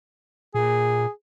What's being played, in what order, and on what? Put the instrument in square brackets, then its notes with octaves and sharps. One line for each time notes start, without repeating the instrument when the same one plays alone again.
[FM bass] A#2 [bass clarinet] G#4